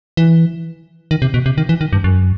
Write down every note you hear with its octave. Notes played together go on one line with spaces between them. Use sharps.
E3
D#3
C3
B2
C3
D#3
E3
D#3
G2
F#2